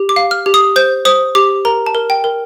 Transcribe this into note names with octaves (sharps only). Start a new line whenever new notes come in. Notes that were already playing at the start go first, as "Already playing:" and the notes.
Already playing: G4
D6
F5
F6
G4
D#6
C5 G6
C5 D#6
G4 D6
A#4 A#5
A5
A#4
G5
A#4